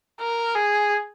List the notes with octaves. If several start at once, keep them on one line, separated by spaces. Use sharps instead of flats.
A#4
G#4